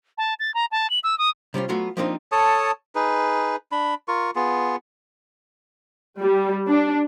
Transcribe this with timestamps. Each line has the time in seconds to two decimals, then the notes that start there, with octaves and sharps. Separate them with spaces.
0.18 A5
0.40 A6
0.54 A#5
0.72 A5
0.90 F#7
1.04 E6
1.18 D#6
1.54 C3 G3 C#4 F4
1.69 F#3 A3 B3 F4 F#4
1.97 F3 A#3 C4 D4 D#4 F4
2.32 A4 C#5 A5 D#6
2.95 D#4 G#4 B4
3.72 D4 B5
4.08 F4 A#4 C#6
4.36 B3 F4 G#4
6.21 G3
6.69 D4